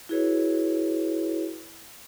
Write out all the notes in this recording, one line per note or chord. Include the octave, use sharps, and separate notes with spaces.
E4 F#4 G#4 B4 C#5